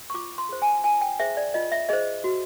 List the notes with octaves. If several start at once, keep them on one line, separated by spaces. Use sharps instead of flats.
C#6
F4 D6
C6
G#4 C5
G#5
F4 G#5
G5
G#4 C5 E5
D5
F4 D#5
E5
G#4 C5 D#5
F#4